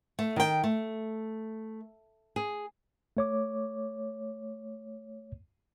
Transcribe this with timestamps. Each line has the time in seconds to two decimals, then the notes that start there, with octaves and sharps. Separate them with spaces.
0.19 A3
0.36 D#3 G5
0.64 A3
2.36 G#4
3.17 A3 C#5 D6